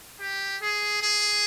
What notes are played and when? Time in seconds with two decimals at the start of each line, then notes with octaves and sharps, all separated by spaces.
0.21 G4
0.62 G#4
1.02 G#4